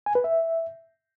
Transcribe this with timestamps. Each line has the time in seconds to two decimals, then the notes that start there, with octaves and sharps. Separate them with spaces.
0.06 G#5
0.15 B4
0.24 E5